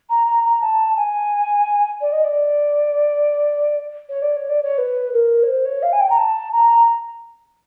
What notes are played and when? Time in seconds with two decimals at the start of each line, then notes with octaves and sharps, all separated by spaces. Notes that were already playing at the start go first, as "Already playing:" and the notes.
0.10 A#5
0.27 A#5
0.44 A#5
0.61 A5
0.97 G#5
2.01 D5
2.12 D#5
2.24 D5
4.09 C#5
4.22 D5
4.36 C#5
4.49 D5
4.63 C#5
4.78 B4
5.13 A#4
5.43 C#5
5.47 C5
5.65 C#5
5.82 F5
5.92 G#5
6.00 G5
6.10 A#5
6.17 A5
6.52 A#5